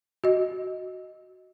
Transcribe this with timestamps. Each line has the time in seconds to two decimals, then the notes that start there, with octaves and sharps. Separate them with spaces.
0.24 F#4 D#5